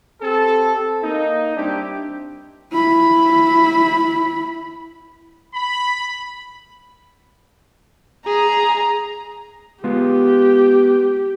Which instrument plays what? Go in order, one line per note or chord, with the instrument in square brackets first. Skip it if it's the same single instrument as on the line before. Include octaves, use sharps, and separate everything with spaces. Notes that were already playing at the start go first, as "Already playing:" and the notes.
[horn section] C4 G4 A4
A#3 D#4
G3 C4 D4 E4 G4
[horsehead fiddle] E4 B5
[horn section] B5
[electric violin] G#4 [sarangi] A#5
[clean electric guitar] G#3 B3 F4 [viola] G4